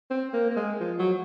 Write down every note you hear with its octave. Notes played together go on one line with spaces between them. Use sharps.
C4
A#3
A#3
G#3
F3
F#3